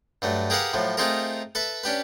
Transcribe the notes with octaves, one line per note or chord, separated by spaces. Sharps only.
G2 F#3 A3
G4 G#4 A#4 B4 F5 F#5
A2 F3 F#3
A3 C4 D#4 F4 G#4 A#4
A4 B4 E5
C#4 D4 G4 B4